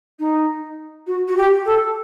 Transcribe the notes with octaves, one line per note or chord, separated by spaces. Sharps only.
D#4
F#4
F#4
G4
A4